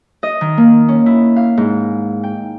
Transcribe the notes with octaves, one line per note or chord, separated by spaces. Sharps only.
D#5
D#3
A#3
C#4
E4
F5
G#2
G5